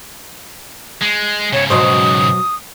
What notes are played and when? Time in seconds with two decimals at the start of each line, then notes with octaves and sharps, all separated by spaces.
1.01 G#3
1.53 G#2 C#3 C#5
1.70 B2 F#3 C5 D#6